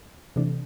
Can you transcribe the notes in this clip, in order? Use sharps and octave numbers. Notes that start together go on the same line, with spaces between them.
C3 E3 A3 D4